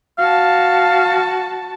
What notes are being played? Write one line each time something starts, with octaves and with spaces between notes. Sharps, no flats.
F#4 F5 A5